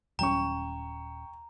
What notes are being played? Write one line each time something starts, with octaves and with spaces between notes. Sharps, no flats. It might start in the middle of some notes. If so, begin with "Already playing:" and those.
D#1 F#3 C#4 G5 A#5 C#6